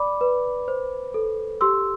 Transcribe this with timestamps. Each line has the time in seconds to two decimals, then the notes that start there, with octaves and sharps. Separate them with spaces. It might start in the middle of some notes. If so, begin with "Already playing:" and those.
Already playing: D5 B5 D6
0.21 B4
0.68 C5
1.14 A4
1.61 G4 C6 E6